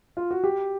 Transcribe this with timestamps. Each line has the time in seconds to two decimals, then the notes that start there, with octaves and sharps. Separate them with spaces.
0.17 F4
0.31 F#4
0.44 G4